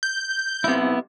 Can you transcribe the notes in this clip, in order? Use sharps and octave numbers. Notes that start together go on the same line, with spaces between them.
G6
B1 C3 B3 E4